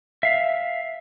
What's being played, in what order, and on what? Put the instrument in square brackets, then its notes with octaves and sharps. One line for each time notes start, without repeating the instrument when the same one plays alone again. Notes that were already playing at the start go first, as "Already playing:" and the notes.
[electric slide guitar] E5 F5